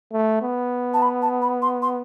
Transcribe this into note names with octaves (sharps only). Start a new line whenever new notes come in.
A3
B3
A5
B5
A5
B5
C6
C6